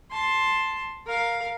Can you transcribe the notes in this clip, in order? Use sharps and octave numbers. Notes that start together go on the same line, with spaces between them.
A5 C6
A#4 F5